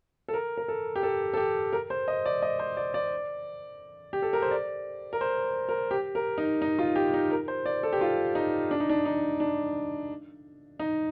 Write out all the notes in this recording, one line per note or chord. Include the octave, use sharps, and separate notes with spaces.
A4
A#4
A#4
A4
G4
A4
A4
G4
A#4
C5
D#5
D5
D#5
C5
D5
D5
G4
A4
A#4
C5
D5
A#4
C5
A#4
G4
A#4
D#4
D#4
F4
G4
D#4
A#4
C5
D5
A4
G4
F4
D#4
D4
D#4
D4
D#4
D4
D#4